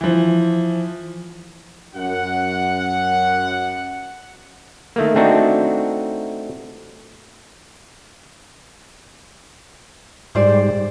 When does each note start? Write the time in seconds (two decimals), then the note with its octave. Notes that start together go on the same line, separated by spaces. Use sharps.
0.01 E3 F3
1.94 F#2 F#5
4.96 D#3 A3 A#3
5.15 A3 C4 D4 D#4 F#4
10.35 G#2 G3 G#4 C5 D5